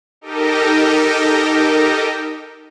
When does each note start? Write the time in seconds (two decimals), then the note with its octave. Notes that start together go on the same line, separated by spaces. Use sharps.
0.21 D#4 G4 A4 A#4 D#5